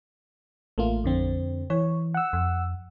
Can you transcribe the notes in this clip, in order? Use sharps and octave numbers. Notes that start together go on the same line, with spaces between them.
A1 A3 A#3 F4
F2 D3 C4
E3 C#5
F#5 E6
F2